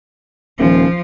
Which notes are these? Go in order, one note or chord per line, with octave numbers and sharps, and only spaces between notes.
D#1 F3